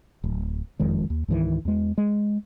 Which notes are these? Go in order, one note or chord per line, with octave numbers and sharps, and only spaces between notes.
D1
F#1 F2 D#3 G#3
D#2
C#2 G#2 D#3 E3
E2 G#3
G#3